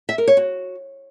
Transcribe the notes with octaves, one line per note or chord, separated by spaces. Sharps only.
E5
A#4
C#5
F#4